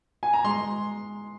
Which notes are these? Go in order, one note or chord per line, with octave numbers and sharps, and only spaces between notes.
G#5
A#5
G#3 C6